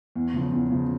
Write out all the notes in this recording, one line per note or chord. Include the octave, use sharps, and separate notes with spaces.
E2
C#3 F3
E2
C#3 F3